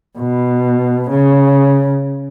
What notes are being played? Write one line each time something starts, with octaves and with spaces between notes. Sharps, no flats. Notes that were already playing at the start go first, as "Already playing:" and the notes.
B2
C#3